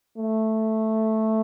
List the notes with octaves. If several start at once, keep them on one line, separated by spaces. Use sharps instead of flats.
A3